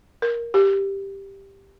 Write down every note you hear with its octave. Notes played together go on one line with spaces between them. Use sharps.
A#4
G4